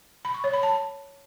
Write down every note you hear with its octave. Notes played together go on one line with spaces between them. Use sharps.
B5
C#6
C#5
B5
A5